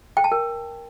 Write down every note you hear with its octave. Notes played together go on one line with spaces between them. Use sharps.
G5
A5
A#4